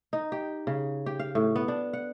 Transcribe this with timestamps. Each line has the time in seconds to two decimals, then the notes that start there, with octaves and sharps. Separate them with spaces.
0.13 D#4
0.32 G4
0.67 C#3
1.06 G4
1.19 F5
1.35 A2
1.56 B3
1.68 D4
1.93 F#5